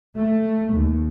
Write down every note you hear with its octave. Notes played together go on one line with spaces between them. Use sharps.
A3
D#2